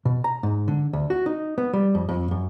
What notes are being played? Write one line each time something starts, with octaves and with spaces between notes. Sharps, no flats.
B2
A#5
G#2
D3
D2
F#4
D#4
B3
G3
F2
F2
F#2